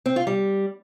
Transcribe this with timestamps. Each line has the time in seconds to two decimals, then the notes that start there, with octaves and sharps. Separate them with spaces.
0.06 C4
0.16 F4
0.27 G3